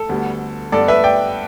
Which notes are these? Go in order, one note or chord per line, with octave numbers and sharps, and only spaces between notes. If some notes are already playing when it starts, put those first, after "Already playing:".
Already playing: A4
D2 D3 G3 B3
G2 G3 B3 A4 D5
B4 E5
D5 G5